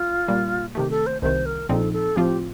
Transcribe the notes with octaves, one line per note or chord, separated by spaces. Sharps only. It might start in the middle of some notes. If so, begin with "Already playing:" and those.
Already playing: F4
A#2 G3 A#3
C3 D#3 A3 G4
A4
C5
C2 C3 D#3 C5
A#4
A#1 A#2 F3 C4 D#4 A4
A4
A2 F3 C4 F4 G4